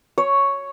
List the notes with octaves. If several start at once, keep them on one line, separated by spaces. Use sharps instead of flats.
C#5